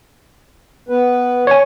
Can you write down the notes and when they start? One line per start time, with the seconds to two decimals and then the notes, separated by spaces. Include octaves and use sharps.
0.89 B3 B4
1.47 C#5 G#5